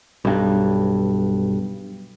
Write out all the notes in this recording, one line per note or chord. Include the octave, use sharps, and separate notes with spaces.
B1 G2